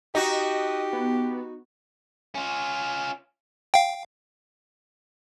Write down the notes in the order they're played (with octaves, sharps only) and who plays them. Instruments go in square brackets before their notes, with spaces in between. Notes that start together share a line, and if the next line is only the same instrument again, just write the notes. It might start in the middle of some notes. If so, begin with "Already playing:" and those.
[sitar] D#4 F#4 [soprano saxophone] G4 [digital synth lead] D#5
[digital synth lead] B3
[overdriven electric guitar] C#4 F4
[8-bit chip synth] F5 G5